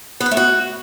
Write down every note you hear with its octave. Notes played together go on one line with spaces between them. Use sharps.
B3
B4
A3
F#4